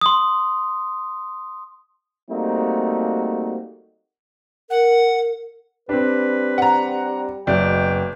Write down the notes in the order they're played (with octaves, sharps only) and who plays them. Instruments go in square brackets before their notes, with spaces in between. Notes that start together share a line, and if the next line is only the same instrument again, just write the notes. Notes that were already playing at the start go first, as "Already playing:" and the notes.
[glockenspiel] C6 D#6
[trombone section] G3 A3 A#3 C4 D#4 F#4
[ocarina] A#4 [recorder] F#5
[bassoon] G3 [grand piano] C4 D4 [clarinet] B4
[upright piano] F#5 A#5
[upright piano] F#1 [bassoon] B2 [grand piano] D5 E5 [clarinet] G5